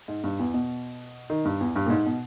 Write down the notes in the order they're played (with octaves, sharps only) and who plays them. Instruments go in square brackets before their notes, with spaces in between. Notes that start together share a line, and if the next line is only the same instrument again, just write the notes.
[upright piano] G#2
G2
E2
B2
D#3
G2
E2
G2
A#2
G#2
B2